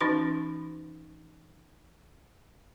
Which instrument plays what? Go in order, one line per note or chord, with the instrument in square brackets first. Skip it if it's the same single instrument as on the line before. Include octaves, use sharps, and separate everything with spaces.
[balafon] E3 C#4 D#4 F#4 C6